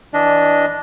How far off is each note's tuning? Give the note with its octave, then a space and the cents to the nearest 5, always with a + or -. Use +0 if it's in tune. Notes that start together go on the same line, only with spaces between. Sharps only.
E3 -15 D4 -5 D#5 +0